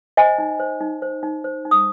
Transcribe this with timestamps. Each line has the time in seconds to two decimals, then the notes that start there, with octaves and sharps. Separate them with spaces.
0.17 C5 D#5 G#5
0.38 D#4
0.60 C5
0.80 D#4
1.02 C5
1.23 D#4
1.44 C5
1.65 D#4
1.71 D#6